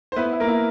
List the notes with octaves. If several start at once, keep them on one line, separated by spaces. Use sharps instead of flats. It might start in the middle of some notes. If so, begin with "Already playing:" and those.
C5
B3 E4 B4
E4
A#3 A#4
E4